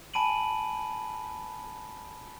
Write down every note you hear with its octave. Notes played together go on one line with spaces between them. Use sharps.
G#5 A5 B5 D7 D#7 F#7